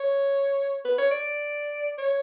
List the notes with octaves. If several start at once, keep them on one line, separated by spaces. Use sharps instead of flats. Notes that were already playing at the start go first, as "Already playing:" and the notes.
Already playing: C#5
B4
C#5
D5
C#5